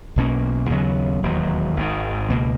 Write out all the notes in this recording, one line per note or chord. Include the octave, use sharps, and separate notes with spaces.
B1 B2 A#3 C#4
D#2 C#3 F#3 B3
E1 D#2 C#3 F#3
G#1 G#2 D#3
C#2 B2 A#3